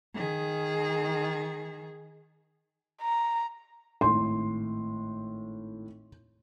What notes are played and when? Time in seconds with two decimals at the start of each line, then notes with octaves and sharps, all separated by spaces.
0.14 D#3 G#4
3.02 A#5
4.01 G#1 A2 C6